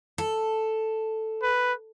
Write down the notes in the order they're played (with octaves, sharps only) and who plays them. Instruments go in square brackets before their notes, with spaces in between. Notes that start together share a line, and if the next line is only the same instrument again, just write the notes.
[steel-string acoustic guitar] A4
[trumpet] B4